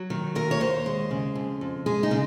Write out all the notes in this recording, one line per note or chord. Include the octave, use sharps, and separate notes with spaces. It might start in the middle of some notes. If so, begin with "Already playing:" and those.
Already playing: F#3
D#3
D#2 A#4
C#5
D#2 C5
G#3
C#3
F2
F2
G#3 G#4
D#4
C#3